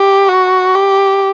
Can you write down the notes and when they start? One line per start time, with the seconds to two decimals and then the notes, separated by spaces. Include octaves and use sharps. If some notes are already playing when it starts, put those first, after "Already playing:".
Already playing: G4
0.29 F#4
0.75 G4